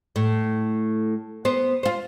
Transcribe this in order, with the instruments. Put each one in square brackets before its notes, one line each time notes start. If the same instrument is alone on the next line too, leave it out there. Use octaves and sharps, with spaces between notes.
[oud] A2
B3 C5
F4 C5